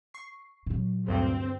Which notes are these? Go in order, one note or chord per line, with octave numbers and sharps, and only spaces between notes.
C#6 C7
A#2 F#3
D2 G2 C4